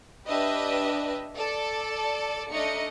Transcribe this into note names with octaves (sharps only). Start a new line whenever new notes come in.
D4 G4 B4 D#5 E5
A4 D5
A3 D4 D#4 D#5 C#7